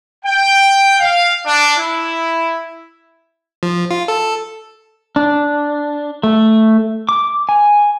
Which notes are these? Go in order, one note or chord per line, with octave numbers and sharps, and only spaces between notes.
G5
F5
D4
E4
F3
F4
A4
D4
A3
D6
G#5